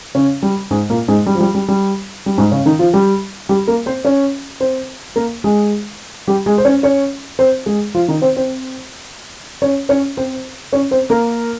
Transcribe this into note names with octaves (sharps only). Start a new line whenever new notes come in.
C#3 C#4
G3
G#2 G#3
A#2 A#3
G#2 G#3
G3
F3
G3
G3
G3
G3
G#2 G#3
C#3 C#4
D#3 D#4
F3 F4
G3 G4
G3 G4
A#3 A#4
C4 C5
C#4 C#5
C4 C5
A#3 A#4
G#3 G#4
G3 G4
G#3 G#4
C5
C#4 C#5
C#4 C#5
C4 C5
G#3 G#4
F3 F4
D#3 D#4
C4 C5
C4 C5
C#4 C#5
C#4 C#5
C4 C5
C#4 C#5
C4 C5
A#3 A#4